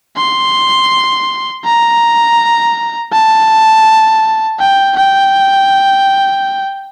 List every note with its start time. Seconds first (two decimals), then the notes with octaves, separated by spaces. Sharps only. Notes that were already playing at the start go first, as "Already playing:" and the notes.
0.17 C6
1.65 A#5
3.12 A5
4.60 G5
4.96 G5